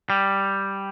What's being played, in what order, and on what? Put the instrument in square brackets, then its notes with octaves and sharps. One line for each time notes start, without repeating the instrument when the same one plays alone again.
[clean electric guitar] G3